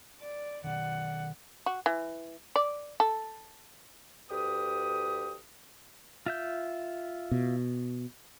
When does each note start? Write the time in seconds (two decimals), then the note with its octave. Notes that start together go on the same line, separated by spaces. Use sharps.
0.21 D5
0.64 B2 D#3 D5 F#5
1.66 F#4
1.86 E3
2.56 D5
3.00 A4
4.30 D2 G4 B4 D#6
6.26 F4 E5 G6
7.31 B2